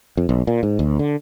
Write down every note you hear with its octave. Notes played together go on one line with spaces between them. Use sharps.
F2
B1
A#2
G#2
D2
D3